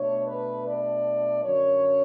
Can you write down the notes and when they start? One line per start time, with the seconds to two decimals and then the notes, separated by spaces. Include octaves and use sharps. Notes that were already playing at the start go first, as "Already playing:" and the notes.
Already playing: B2 A3 D4 C#5
0.26 B4
0.65 D5
1.44 F#2 D3 F#3 C#4 C#5